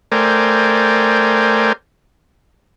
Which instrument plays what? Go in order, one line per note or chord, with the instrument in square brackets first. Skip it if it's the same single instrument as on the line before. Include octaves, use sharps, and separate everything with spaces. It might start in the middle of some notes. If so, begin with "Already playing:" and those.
[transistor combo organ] A3 A#4 C5 D5 G5 G#5